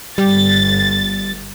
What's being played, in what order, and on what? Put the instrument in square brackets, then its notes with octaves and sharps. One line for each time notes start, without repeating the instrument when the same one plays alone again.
[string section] G1 A6 [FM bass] G3